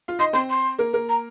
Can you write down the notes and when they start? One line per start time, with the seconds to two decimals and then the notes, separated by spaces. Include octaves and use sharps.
0.08 F4 F5
0.19 D#4 D#5 C6
0.33 C4 C5 C6
0.49 C6
0.79 A#3 A#4
0.93 A#3 A#4
1.08 A#5